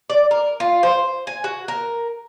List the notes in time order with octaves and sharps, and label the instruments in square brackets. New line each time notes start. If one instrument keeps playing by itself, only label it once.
[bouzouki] D5
A#4
F4
C5
G#5
F#4
A#4